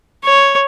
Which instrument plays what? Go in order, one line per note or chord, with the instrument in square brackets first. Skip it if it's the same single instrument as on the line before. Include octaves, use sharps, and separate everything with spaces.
[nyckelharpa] C#5